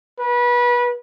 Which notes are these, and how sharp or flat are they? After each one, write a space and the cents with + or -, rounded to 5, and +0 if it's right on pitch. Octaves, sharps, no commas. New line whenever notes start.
B4 -25